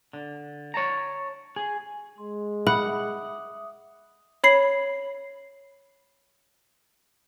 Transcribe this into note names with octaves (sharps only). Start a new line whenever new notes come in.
D3
C#5 A5 A#5
G#4
G#3 C6
E5 F#5 B5 D6 D#6
C#5 B5 C7